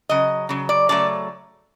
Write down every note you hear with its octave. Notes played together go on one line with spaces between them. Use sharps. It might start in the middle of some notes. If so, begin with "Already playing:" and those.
C#3 F#3 D#5
C#3 F#3
D5
C#3 F#3 A3 D5